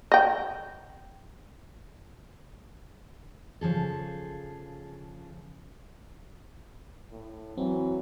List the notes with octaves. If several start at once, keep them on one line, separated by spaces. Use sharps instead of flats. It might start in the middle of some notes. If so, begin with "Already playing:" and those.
D#5 G5
C#3 F3 G#4 A4
A2
E3 F#3 C4